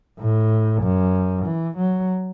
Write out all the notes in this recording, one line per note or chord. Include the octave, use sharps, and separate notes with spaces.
A2
F#2
E3
F#3